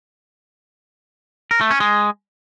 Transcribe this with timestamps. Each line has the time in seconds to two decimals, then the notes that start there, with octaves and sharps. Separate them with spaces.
1.51 A#4
1.61 A3
1.71 C#4
1.80 G#3